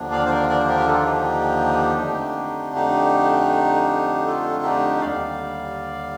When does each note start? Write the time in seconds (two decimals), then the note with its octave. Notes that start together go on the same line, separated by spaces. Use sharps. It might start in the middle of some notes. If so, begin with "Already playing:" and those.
Already playing: D#2 D3 F3 A#3 D4
0.12 D5 F5
0.26 C5
0.30 A#4 D5
0.49 A#4 D5
0.59 C5
0.68 G4 A#4
0.79 G4
0.87 F4 A4
1.05 D#4 G4
2.00 F2 D3 A3 D4
2.75 D#4 G4
4.26 F4 A4
4.63 D#4 G4
5.01 D#2 D3 G3 D5 F5